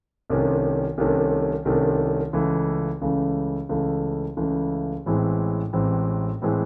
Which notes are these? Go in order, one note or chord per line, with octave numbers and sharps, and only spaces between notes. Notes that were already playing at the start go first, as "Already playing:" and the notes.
C2 C3 D#3 A3 C#4
C2 C3 D#3 A3 C#4
C2 C3 D#3 A3 C#4
C#2 C#3 E3 A3
C#2 C#3 E3 A3
C#2 C#3 E3 A3
C#2 C#3 E3 A3
A1 A2 E3 G#3 C4
A1 A2 E3 G#3 C4
A2 E3 G#3 C4